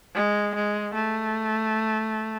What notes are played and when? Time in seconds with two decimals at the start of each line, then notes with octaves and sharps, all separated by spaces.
0.15 G#3
0.55 G#3
0.94 A3